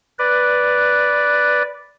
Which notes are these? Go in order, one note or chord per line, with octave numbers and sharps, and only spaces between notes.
B4 D5